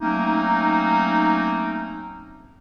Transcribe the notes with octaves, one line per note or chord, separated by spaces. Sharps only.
F#3 A3 A#3 C4 C#4 D#4